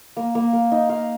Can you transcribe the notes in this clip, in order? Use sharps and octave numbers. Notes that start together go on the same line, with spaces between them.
A#3
A#3
A#3
D#4
F5